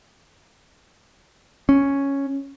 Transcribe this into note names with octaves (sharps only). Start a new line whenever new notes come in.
C#4